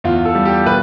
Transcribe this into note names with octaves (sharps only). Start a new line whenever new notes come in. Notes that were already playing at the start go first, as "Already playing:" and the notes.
E2 F4
A4
G3
G4
B2 B4